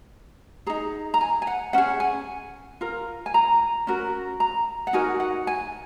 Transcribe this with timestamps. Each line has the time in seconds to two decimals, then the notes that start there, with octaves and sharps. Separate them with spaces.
0.67 D#4 G#4 A#5
1.14 A#5
1.21 G#5
1.42 G#5
1.47 F#5
1.73 C#4 G#4 F#5
2.00 G#5
2.81 F4 A#4
3.26 G#5
3.34 A#5
3.87 C#4 F#4 A#4
4.40 A#5
4.87 F#5
4.93 D#4 F#4 A#4 G#5
5.20 F#5
5.47 G#5